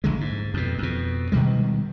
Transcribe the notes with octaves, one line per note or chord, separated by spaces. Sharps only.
A#1 D3 G#3
G#2
F2 B2
F2 B2
B2 D#3 G3 G#3